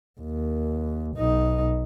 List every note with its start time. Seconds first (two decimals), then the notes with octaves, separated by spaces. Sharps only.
0.21 D#2
1.17 B1 D#4